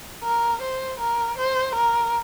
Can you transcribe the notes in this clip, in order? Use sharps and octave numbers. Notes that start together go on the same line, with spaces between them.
A#4
C5
A#4
C5
A#4